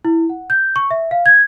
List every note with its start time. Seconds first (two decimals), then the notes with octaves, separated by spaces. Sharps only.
0.05 E4
0.29 F#5
0.50 G6
0.76 C#6
0.91 E5
1.11 F5
1.26 G#6